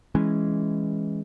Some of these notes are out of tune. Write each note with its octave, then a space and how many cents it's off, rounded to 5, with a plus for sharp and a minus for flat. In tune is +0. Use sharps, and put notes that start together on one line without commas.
E3 +0 G#3 +0 C#4 -5